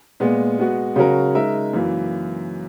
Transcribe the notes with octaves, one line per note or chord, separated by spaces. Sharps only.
A#2 G#3 B3
G#3 B3 F#4
C#3 F#3 C#4 F#4 A#4
G#3 D#4 A#4 E5
F#2 E3 A#3